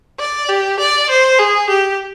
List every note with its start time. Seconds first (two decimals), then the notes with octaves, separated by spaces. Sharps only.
0.20 D5
0.50 G4
0.80 D5
1.10 C5
1.39 G#4
1.70 G4